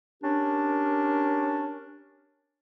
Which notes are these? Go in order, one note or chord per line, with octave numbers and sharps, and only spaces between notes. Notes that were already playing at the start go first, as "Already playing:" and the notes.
C#4 D4 G4 A#4